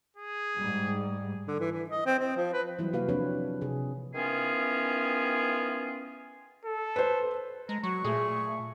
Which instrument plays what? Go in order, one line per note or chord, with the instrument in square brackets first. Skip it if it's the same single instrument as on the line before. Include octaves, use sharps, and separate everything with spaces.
[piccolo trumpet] G#4
[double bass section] G#2 G3
[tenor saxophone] D3
E3
E3
D#5
C4
C4
F3
B4
[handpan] E3 F#3 G3 E4
C3 A#3 F#4 G4 B4 F5
F3 C4 D4 B4 C#5
C3 G#4
[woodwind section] D#3 E3 B3 C#4 F4 G#4
[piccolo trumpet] A4
[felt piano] B4 C5
[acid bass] G#3 [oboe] A#5
[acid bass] F#3 [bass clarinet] F#4 [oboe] C#6
[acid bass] A#2 [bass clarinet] A3 [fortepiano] G#4